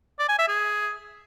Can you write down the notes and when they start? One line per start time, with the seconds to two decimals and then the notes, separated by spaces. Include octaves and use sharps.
0.19 D5
0.29 G#5
0.38 E5
0.48 G#4